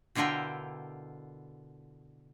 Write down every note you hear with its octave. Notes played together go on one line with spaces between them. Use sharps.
B2 D3 E4 F4 A#4 G5